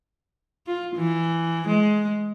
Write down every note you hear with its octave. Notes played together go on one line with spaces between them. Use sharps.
F4
E3
G#3